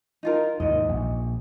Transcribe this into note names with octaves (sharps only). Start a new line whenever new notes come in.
D#4 F4 A#4
D#2 G#2 D#5
A#1